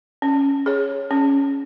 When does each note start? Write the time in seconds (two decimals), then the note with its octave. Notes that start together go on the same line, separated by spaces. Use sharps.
0.22 C#4
0.66 G#4 C#5
1.11 C#4